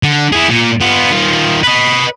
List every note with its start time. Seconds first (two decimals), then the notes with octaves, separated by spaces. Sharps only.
0.03 D3
0.33 E4 G#4
0.49 A#2
0.81 B3 F4
1.11 D#3 F4
1.63 B4 D#5